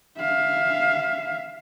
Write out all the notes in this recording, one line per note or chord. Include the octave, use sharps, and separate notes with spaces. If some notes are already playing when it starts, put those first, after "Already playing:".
E5 F5